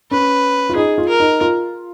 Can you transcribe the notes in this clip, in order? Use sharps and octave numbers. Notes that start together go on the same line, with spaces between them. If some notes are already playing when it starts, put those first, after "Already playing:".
C#4 B4
F4
D#4 G#4
F4
A#4
D#4
F4